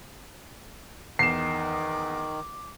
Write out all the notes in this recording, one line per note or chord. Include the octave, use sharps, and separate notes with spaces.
E2 D#3 D6 C7 E7